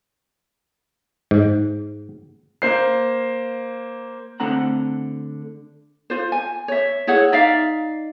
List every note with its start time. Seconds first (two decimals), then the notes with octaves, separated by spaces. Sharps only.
1.31 G#2
2.62 A#3 C5 C7
4.40 D3 A3 C4 F#5 A#5
6.10 F4 C5
6.32 G#5
6.68 C#5 E5
7.07 E4 G#4 C#5 F#5
7.32 D#4 D5 E5 F5